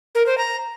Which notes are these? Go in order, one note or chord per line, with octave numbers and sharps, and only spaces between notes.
A#4
C5
A#5